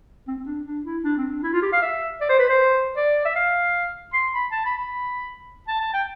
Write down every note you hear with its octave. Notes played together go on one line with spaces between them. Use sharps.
C4
C4
D4
D4
E4
D4
C4
D4
E4
F4
G4
F5
E5
D5
C5
B4
C5
D5
E5
F5
C6
B5
A5
B5
B5
A5
A5
G5